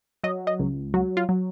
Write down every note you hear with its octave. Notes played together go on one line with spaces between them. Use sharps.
F#3 D#5
D#5
C#2
F#3 F#4
F4
F#3